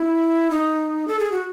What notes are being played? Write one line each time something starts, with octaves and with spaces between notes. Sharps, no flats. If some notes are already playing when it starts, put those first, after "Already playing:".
Already playing: E4
D#4
A4
G#4
F#4